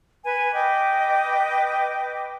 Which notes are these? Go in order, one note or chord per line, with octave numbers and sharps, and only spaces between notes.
B4 G#5
B4 D#5 G5 D6